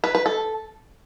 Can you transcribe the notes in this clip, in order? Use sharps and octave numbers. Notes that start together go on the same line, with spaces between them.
B4
B4
A4